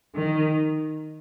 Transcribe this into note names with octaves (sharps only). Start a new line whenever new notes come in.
D#3